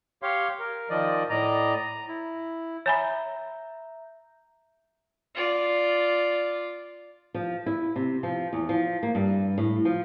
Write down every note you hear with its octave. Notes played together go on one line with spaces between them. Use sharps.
G4 C#5 F5 C6
A#4
D#3 F3 D5 D#5
A2 D5 D#5 A#5
A#5
E4
C#5 E5 G#5 A#5 B5 G6
F4 D5
F3
E4
C3
F3
E2
F3
A#3
G2
A2
F3